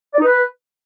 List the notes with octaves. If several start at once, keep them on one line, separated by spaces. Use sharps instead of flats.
D5
D#4
B4